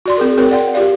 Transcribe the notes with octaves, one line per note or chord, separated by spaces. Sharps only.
F#4 D5 C6
C4 G#4 A#4
C4 F#4 A#4 C#5 G5
D5 F#5 G5 C6
F4 G4 A#4 D5 F5